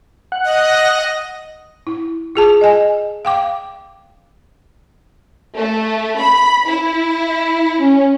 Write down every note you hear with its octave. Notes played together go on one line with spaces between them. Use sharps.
F#5
D#5
E4
F4 G#4 A5
D#5 G#5
F5 G5 D6
A3
B5
E4
C#4